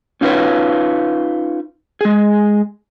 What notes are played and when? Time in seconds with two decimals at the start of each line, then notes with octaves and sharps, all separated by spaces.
0.21 C#4 D#4 F4 A4 B4 C#5
2.01 G#3 G#4